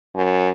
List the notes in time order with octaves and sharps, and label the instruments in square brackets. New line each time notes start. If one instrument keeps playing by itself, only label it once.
[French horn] F#2